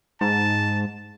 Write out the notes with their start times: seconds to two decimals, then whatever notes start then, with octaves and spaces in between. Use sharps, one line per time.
0.21 G#2 A5